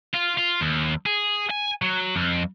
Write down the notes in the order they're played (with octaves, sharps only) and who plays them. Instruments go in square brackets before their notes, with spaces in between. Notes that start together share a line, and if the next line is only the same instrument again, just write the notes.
[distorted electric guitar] F4
F4
D#2
G#4
G#5
F#3
F2